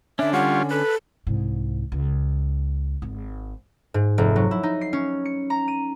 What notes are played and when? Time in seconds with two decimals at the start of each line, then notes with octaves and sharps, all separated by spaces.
0.19 D3 C#4 D4 E5
0.33 G3 F4 C#5 F#5
0.71 A4 B4
1.27 C2 G#2
1.92 C#2
3.02 G#1
3.94 G#2
4.18 F1
4.36 F#3
4.51 E4
4.63 D#4
4.81 C7
4.93 C#4
5.25 C#7
5.50 A#5
5.68 D#7